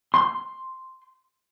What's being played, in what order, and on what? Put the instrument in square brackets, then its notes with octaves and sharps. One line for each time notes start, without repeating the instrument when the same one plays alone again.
[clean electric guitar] C6